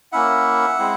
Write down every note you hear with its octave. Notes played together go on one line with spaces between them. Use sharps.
A#3 C#4 E4 E5 F#5
G#3 C4 E4